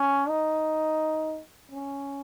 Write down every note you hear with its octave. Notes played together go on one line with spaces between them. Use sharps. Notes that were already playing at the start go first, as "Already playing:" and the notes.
Already playing: C#4
D#4
C#4